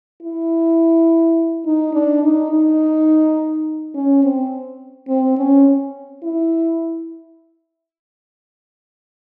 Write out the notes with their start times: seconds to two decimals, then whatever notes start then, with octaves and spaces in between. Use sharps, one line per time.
0.23 E4
1.66 D#4
1.94 D4
2.23 D#4
2.51 D#4
3.94 C#4
4.23 C4
5.08 C4
5.37 C#4
6.23 E4